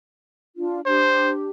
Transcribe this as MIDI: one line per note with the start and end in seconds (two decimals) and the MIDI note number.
0.56 0.79 62
0.56 0.79 65
0.86 1.50 62
0.86 1.50 67
0.86 1.31 72